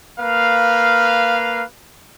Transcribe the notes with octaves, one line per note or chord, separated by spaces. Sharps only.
A#3 B4 F5